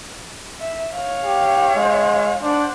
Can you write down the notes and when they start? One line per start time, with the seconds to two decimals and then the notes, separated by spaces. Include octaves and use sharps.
0.61 E5
0.93 C#5 F5
1.25 G4
1.76 G#3
2.43 D4 C5 F#5